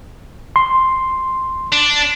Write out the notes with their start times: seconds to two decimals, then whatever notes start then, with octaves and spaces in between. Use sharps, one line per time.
0.56 C6
1.72 D4